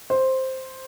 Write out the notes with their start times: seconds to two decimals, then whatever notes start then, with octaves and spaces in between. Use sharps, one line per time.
0.10 C5